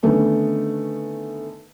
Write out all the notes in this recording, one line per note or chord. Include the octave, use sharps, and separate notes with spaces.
D3 D#3 A3 B3 C#4